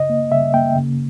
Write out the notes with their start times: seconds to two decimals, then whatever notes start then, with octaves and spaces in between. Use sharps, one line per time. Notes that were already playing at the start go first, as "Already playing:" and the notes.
Already playing: C#3 D#5
0.10 A#3
0.32 C#3 E5
0.54 A#3 G5
0.76 C#3